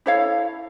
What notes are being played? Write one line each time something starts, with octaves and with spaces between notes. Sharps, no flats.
E4 A4 C#5 F5